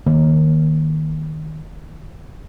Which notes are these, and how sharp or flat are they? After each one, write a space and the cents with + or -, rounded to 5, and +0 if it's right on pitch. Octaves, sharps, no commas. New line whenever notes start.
D#3 +0 A#3 +0